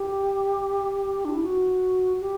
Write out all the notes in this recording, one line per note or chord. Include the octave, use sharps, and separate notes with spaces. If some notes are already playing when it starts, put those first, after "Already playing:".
Already playing: G4
D4
E4
F#4
G4